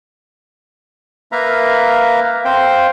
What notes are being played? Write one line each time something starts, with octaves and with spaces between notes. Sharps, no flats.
A#3 A#4 B4 E5 F5 A#5
C4 C5 F5 G5